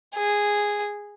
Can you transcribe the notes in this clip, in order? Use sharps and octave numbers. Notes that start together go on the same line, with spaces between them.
G#4